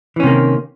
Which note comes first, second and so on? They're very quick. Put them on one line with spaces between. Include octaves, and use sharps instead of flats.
E3 C#4 C3 A#3 D#3